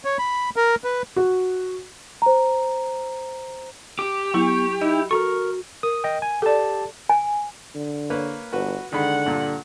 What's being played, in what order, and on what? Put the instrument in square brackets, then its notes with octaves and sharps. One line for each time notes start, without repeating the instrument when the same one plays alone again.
[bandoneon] C#5
B5
A#4
B4
[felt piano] F#4
[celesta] C5 A#5
[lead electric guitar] G4 [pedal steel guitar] D6
[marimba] F#3 E4 [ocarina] B3 [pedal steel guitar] C#6
[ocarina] D#4 [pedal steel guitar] E4 [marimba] D#5
[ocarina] F#4 [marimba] A4 [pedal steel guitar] A#4 A#5 C#6
[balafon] A#4 [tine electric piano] D#6
[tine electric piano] D#5 G5
G#5
[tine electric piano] G4 A5 [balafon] A4 D5
[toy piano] G#5
[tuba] D3
[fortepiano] A#3 B4 C#5
[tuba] G1 [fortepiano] F#4 B4
[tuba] D3 [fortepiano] D#3 G#3 B5 [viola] F#5
[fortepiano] G2 A#2